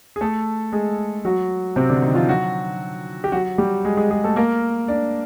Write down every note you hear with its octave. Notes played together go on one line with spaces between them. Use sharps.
G#4
A3 A4
G#3 G#4
F#3 F#4
C3 C4
D3 D4
D#3 D#4
F3 F4
F#3 F#4
G4
F#3 F#4
G3 G4
G#3 G#4
G#3 G#4
G#3 G#4
A3 A4
A#3 A#4
D4 D5